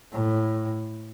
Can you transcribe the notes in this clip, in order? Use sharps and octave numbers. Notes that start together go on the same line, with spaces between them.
A2